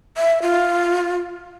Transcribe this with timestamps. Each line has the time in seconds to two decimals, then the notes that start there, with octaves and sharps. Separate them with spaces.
0.17 E5
0.42 F4